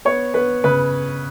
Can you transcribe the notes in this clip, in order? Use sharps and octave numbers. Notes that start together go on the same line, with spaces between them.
B3 C#5
B3 B4
C#3 B4